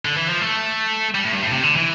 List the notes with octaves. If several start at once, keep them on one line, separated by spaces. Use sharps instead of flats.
D3
E3
F3
A3
G3
A2
G2
A2
C3
D3
E3